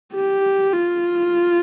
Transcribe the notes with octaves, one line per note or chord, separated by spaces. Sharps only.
G4
F4